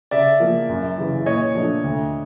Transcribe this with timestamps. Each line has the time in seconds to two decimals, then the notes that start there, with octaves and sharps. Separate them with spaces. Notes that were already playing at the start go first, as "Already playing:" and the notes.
0.11 C#3 D5 E5
0.40 F3 A#3
0.69 F#2
0.98 C#3 E3
1.26 A#2 C#5 D#5
1.55 F3 A3 D4
1.84 D2